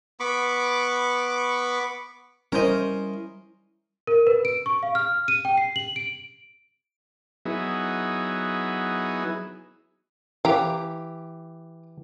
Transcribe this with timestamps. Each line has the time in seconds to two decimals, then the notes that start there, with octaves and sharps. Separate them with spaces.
0.20 B3 B5 C#6 D6
2.52 G3 C#4 E4 A#4 C5 D#5
4.07 A#4
4.27 B4
4.45 D7
4.66 C#6
4.83 F5
4.95 F6
5.28 D#7
5.45 G5
5.57 C7
5.76 F#7
5.96 D7
7.45 F#3 B3 D#4 E4 G#4
10.45 E3 G4 F5 G5 A#5